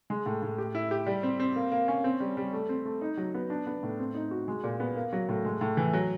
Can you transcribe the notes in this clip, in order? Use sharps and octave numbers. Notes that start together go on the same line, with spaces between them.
G#3
A2
A2
G4
E4
G4
G3
C4
C4
A#3
A#3
C#4
C4
G3
G3
A3
C4
A3
D#4
F#3
B3
D4
B3
A2
C4
D#4
F#4
G#3
A#2
B3
A#3
F#3
A2
G#3
A2
E3
F#3